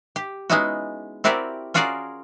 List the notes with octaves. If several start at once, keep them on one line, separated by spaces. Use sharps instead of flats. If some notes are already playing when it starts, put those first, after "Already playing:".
G4
G#3 B3 C#4 D#4 E4 F#4
C4 E4 F#4 G4 A#4 D5
C#4 F4 F#4 G#4 A#4 D5